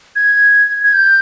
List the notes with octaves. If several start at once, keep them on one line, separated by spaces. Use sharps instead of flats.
G#6
G#6
G6